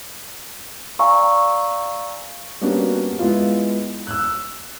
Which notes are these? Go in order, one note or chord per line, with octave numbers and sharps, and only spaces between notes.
D5 F5 G#5 A#5 C#6 E6
G3 A#3 B3 C#4 D4 F#4
G#3 B3 E4 F4
E6 F#6